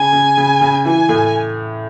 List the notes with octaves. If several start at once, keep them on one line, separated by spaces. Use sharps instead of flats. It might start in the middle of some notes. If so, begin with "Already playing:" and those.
Already playing: C#3 G#5
C#3
C#3
C#3
E3 G#5
A2